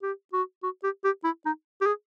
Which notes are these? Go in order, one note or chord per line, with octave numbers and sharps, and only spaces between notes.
G4
F#4
F#4
G4
G4
E4
D#4
G4
G#4